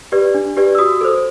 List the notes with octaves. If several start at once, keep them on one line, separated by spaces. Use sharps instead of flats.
G4 B4 D5
D4
G4 B4 D5
E6
F#4 D#6
A4 C5